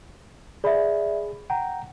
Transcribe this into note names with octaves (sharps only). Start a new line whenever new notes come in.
G#4 D5 E5 B5
F#5 G5 A#5